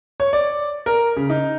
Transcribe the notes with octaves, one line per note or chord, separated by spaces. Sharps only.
C#5
D5
A#4
C#3
D#4